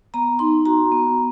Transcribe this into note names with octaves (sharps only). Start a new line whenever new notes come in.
B3 A#5
D#4 C6
F#4 A#5
B3